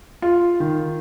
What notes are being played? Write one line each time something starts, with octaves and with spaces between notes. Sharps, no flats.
F4
D#3